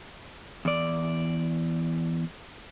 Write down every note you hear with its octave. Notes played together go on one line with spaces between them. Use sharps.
E2 D5